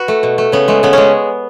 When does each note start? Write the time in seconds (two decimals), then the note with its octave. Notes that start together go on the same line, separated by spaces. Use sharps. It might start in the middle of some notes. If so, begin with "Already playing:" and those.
Already playing: F#4 B4
0.08 A3
0.23 B2
0.38 A3
0.52 C#3 B3
0.68 G#3 A3
0.83 C#3 B3
0.93 G#3 C#4